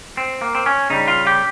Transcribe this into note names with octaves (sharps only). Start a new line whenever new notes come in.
C4
A#3
C4
C#4
C#3 G3 D#4
F4
G4